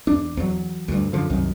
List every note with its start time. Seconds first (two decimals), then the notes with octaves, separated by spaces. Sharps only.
0.07 E2 D4
0.37 E2 F#3
0.88 D2 G2
1.13 F#2 D3 F3
1.30 C2 F#2 D#3